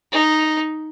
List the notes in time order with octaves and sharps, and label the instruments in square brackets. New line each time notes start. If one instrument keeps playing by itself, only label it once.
[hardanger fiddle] D#4